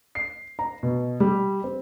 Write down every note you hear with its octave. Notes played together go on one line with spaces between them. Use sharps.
C7
A#5
B2
G3
C4